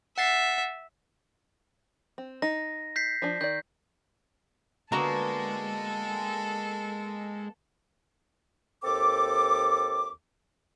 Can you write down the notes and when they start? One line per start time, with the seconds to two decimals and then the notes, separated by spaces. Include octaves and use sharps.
0.18 E5 F#5 A6 C7
2.18 C4
2.42 D#4 A#6
2.96 G6 B6 C7
3.22 F3 D4
3.41 D#3 D5 G6
4.92 D3 G#3 A#3 B3 F#4 A4 A#4 A#5
8.84 D#2 C4 A4 D6